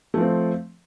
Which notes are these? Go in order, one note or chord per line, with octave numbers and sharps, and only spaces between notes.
F3 A3 C4